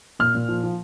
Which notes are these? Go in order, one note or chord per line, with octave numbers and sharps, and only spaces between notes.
A#2 F6
A#2
F3
F3